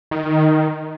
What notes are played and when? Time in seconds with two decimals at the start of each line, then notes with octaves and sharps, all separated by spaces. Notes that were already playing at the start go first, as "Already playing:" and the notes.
0.11 D#3